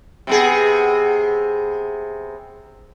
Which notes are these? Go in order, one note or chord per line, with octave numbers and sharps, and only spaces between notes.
C3 B3 G#4